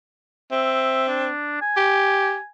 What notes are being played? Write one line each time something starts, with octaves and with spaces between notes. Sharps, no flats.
C4 E5
D4
G#5
G4